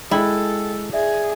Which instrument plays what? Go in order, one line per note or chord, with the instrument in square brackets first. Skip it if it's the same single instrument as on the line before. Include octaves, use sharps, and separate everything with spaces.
[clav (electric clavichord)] G#3 [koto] E4 [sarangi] A4 [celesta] G5
[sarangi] G#4 [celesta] D5 E5